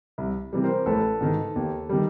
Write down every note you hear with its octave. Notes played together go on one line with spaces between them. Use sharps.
C2
C3 E3 G3
A#4 C5
A1 A4 B4
G#2 D#3
D#2
D#3 G3